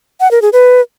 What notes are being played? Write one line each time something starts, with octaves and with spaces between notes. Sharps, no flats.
F#5
A#4
G#4
B4